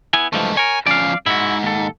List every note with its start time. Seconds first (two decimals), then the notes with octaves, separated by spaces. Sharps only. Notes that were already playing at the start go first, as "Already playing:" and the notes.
0.13 B3 E4 G#5
0.33 G2 E3 F3 G#3 A3
0.57 A#4 C#5 G#5
0.86 F3 C#4 D5 F5
1.26 G#2 E4 F#4
1.63 D#2 A4